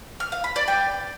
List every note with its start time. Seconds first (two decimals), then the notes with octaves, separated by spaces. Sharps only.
0.20 F6
0.32 F5
0.44 B5
0.56 D5
0.68 G5